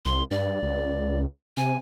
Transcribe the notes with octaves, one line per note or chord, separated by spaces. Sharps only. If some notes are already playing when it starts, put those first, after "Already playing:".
C2 C6
G2 D5
C#2
C3 G#5